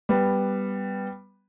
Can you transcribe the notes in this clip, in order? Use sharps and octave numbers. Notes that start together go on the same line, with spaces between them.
G3 B3